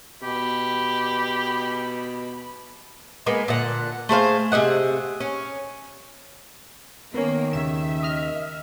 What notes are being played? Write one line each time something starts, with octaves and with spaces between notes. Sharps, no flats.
B2 G4 B5
G#3 A#3 B3
A#2 D3 F#5
A3 G#4 C5 F5
C3 G#4 D#5 F#5
C#4
D#3 A#3 B3 C#4
D#2 A2 C#3 E5 E7
D#5 F6